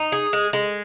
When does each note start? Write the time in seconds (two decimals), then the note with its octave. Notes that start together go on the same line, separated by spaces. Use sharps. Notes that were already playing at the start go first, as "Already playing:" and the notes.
Already playing: D#4
0.12 G#4
0.33 G#3
0.53 G#3